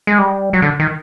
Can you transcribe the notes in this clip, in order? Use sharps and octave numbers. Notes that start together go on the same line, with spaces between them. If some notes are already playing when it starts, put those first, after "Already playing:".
G#3
G3
F#3
D3
D#3